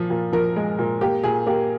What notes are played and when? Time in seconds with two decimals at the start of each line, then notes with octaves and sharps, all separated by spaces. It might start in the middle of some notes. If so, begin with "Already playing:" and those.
Already playing: A#2 F3
0.10 A#2
0.33 F3 A#4
0.56 G#3
0.79 A#2
1.01 A#3 G4
1.23 A#2 G#4
1.47 A#3 G4